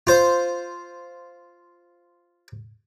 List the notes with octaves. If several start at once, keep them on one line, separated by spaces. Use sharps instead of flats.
F4 C5